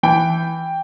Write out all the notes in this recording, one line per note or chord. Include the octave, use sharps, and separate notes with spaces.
E3 G5